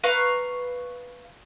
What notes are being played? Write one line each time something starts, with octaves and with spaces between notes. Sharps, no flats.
B4 F5 A#5 C#6